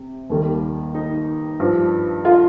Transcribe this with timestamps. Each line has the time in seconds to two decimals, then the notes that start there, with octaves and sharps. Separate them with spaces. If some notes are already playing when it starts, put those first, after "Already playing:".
Already playing: C3
0.30 D#2 D#3 G3
0.95 D#4
1.60 G2 F3
2.25 F4